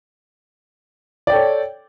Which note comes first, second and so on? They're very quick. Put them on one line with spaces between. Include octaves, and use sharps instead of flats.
D5 G5 A4 C#5